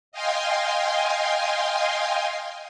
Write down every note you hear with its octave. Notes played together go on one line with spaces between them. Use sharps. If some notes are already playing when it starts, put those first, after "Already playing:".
D#5 F5 G5 G#5 C6